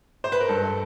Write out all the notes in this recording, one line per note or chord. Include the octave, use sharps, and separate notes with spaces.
C5
B4
A#4
G2 A4